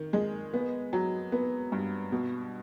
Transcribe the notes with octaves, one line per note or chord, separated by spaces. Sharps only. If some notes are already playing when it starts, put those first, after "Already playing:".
Already playing: D#3
G#3
B3
F#3
B3
G2
B2